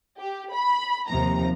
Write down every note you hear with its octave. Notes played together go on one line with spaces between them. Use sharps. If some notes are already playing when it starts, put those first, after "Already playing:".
G4
B5
D#2 C3 F3 A#5